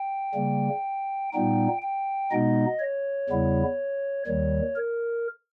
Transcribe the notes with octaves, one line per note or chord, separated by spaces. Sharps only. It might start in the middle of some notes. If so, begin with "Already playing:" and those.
Already playing: G5
C#3 G3 A#3
A#2 G3 B3 D#4 G5
G5
B2 G#3 B3 D#4 D#5
C#5
E2 C#3 G3 B3 E4
D#2 D#3 G3 C#5
A#4